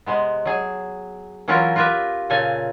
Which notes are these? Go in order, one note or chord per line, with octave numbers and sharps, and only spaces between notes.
C3 G#3 B3
F#3 G#4
E3 F#3 C#4 E4 F4 A#4
F4 G4 A#4 B4 E5
A#2 C#3 A4 G#5 A#5